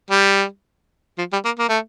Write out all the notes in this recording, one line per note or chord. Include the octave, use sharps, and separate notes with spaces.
G3
F3
G3
A#3
A#3
A3